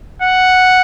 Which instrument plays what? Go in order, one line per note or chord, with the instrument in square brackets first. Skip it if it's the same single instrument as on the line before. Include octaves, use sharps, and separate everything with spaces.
[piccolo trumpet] F#5